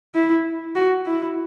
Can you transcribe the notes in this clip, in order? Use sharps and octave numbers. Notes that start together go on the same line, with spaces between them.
E4
F#4
E4